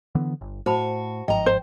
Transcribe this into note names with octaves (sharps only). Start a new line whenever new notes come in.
D3 E3 B3
G1
A2 F#4 C5 A5 B5
G1 G#2 F3 D#5 G5 A#5
C5